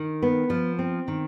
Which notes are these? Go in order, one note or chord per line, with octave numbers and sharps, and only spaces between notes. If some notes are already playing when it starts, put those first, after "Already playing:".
Already playing: D#3
B3
F3
C4
D#3